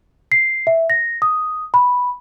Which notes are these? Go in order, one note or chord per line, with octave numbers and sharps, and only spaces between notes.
C7
E5
A#6
D#6
B5